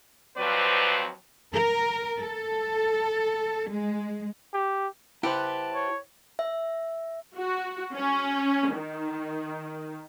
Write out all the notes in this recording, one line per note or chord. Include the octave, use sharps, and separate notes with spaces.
D#2 F3 F#3 C4 B4 D5
A#4
A4
G#3
G4
E4 G4 B4 C5 F#5 A5
C#5
E5
F#4
C#4
D#3